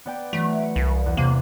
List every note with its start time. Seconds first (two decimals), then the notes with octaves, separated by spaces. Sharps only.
0.05 B3 D5 G5
0.33 E3 F#3 A3
0.59 C#7 D7
0.76 C2
1.06 E2 E3
1.17 C3 A#3